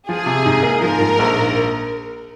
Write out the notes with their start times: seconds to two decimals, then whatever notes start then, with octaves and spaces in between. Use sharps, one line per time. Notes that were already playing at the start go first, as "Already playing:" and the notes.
0.08 F3 G#4
0.26 C3
0.46 G#2
0.63 A#3
0.82 F3 A#4
1.00 G#2
1.19 A#1